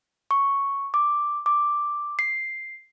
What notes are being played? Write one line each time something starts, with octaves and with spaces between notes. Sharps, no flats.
C#6
D6
D6
C7